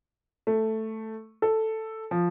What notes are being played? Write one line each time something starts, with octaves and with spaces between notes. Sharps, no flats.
A3
A4
F3